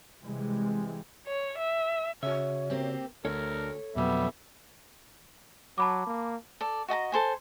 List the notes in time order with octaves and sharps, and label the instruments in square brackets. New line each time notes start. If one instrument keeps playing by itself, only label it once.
[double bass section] C3 E3 G3 G#3
[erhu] C#5
E5
[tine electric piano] C#3 F#4 [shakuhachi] C#5 [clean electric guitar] E5
[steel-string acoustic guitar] A#3 C4 G4
[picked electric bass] D2 [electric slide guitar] A4 C#5 [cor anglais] A#4
[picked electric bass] F2 B2 F#3 [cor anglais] G3 [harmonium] B3 E5
[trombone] F#3 [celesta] A5 B5 D6
[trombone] A#3
[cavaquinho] A4 D5
F#4 D#5 A5 A#5
A4 C5 G#5